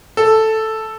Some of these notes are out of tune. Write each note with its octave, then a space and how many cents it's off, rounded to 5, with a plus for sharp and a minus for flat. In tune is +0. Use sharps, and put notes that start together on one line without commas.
A4 +0